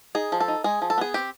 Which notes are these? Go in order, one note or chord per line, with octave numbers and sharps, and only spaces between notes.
D#4 G#4
F3
A4
D#4
G#3 G#4
F3
A4
B3 G#4
C4 G4